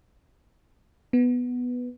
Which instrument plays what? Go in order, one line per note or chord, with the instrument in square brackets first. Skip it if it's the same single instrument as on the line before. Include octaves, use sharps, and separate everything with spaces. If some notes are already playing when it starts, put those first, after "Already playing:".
[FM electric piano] B3